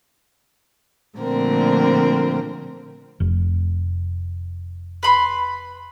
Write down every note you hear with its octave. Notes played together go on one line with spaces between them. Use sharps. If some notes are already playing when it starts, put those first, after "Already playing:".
A#2 D3 F3 A3 C4 A#4
F1
B4 B5 C6